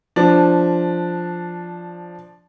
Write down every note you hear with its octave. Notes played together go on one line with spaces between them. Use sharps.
F3 D4